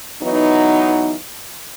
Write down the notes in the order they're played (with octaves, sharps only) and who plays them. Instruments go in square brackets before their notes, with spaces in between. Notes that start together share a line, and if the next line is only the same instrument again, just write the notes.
[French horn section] E3 F#3 B3 D#4